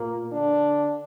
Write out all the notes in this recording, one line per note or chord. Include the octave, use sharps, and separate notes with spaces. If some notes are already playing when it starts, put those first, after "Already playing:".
Already playing: A#2 A#3
D3 D4